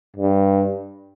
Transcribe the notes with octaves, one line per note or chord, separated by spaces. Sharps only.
G2